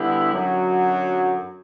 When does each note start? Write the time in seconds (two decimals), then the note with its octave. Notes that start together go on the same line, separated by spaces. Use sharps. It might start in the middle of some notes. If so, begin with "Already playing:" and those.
Already playing: D3 G3 B3 E4 G4
0.32 F#2 D3 F#3